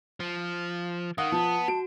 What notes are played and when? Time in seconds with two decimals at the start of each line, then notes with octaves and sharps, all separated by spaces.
0.20 F3
1.18 D#3 F5 F#5 D#6
1.32 F3 B3 A5
1.68 F#4 D7